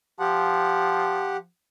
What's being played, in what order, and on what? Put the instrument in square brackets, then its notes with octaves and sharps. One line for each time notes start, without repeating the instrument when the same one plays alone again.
[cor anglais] F3 [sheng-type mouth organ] G4 F#5